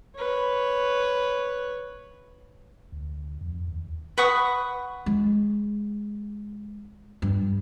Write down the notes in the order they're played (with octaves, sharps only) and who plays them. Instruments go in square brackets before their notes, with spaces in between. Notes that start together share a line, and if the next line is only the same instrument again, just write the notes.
[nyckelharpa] B4 C#5
[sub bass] D2
F2
D#2
[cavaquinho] B4 F#5 C#6 D#6
[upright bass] G#3
G2